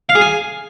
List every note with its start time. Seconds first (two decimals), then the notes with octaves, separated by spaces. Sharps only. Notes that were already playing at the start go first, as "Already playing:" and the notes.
0.09 F5
0.15 G#4
0.21 G#5